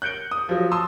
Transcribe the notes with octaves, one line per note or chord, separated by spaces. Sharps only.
F#6 G6 C#7 D7 G7
D#6
F3 F#3
A5 C6 D#6 E6